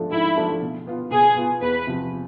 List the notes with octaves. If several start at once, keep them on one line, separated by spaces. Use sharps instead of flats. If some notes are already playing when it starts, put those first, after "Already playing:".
Already playing: G#2 F3 A3 D4 A4
G#2 E4
F3 A3 D4 A4
B2
B3 F4
B2 G#4
B3 F4
E2 B4
C3 F3